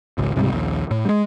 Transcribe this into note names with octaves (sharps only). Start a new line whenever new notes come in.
G#1 C#2
C#2 G#2 C3 G3
A#1 D#2
A2
G3 G#3